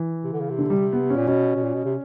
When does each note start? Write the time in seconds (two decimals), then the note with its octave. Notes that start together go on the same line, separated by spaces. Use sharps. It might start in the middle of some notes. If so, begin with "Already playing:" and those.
Already playing: E3
0.24 C3
0.33 D3
0.40 C#3
0.50 C3
0.59 D3
0.70 G3
0.93 B3
1.10 C#4
1.16 A#2
1.28 B2 C#4
1.56 B2
1.63 A#2
1.74 B2
1.85 C3